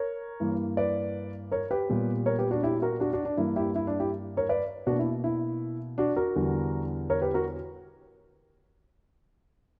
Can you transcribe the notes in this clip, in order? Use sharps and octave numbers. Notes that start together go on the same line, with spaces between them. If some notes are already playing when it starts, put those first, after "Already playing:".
Already playing: A#4 C#5
G2 E3 A#3
B4 D5
A#4 C#5
G4 B4
A#2 G3 B3
A#4 C#5
G4 B4
D4 F#4
E4 G4
F#4 A#4
D4 F#4
D4 F#4
D4
G2 E3 A#3 E4
E4 G4
E4
D4
E4 G4
A#4 C#5
B4 D5
B2 A#3 D4 F#4
E4
E4
D4 F#4
F#4 A#4
E2 D3 G3
A#4 C#5
G4 B4
F#4 A#4